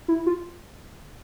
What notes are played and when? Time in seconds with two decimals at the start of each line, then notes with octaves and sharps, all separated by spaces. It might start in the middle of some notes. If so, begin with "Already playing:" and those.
0.08 E4
0.26 F4